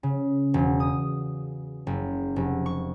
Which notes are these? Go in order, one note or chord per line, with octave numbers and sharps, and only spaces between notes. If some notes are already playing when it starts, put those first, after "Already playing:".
C#3
E1
D#6
F#1
F1
C#6